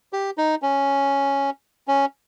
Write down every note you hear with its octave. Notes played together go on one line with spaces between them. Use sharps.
G4
D#4
C#4
C#4